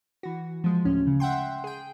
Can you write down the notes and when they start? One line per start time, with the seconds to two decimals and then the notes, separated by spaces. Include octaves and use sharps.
0.23 E3 F#4
0.64 F3 G#3
0.85 D2 A2 C#4
1.07 C#3
1.20 E5 F#5 G5 C6
1.64 G#4 G5